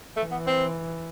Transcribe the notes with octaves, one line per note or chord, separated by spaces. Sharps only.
E3 A3
B3
C4